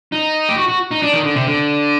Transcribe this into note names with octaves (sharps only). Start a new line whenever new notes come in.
D#4
G4
F#4
F#4
D#4
D4
D#3
D3
C3
D3